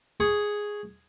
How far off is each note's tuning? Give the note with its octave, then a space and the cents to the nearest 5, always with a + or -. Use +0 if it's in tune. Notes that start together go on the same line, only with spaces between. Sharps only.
G#4 +0 C#6 +0